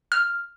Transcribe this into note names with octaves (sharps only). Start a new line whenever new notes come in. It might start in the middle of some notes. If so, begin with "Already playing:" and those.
F6